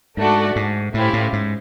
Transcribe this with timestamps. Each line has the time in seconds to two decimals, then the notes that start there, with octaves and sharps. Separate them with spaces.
0.17 G#2 A3 D4 F#4 A4 D5
0.56 G#2
0.94 A2 C#4 E4 G4 C5 F5
1.13 A2
1.33 G#2